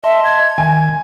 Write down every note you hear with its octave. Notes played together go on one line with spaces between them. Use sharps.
D#5 E5 A5 C6
G#6
D#3 G#5